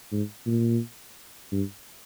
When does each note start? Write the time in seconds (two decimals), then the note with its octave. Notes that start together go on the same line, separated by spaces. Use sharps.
0.12 G#2
0.46 A#2
1.52 G2